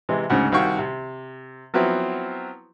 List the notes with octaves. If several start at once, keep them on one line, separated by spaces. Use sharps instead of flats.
C3 E3 G#3
D2 G#2 C#3 F#4
C2 D#3 F#4 F5 G5 C#6
C3
F3 F#3 B3 C4 E4